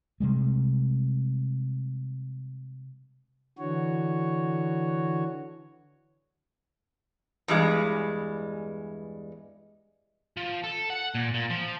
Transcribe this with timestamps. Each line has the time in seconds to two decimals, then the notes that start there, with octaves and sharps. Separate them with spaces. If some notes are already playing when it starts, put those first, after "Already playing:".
0.20 C3 G3 G#3
3.59 D3 E3 F#4 C#5
7.48 E2 G2 G3 G#3
10.37 F3
10.64 A4
10.90 F#5
11.15 A#2
11.34 A#2
11.50 F3